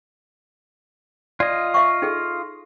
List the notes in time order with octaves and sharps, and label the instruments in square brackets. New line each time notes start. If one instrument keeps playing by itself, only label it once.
[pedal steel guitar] F4 D#5 [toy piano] D5
[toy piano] E5 F5 C#6
D#4 G#4 A4